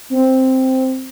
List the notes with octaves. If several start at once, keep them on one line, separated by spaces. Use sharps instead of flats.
C4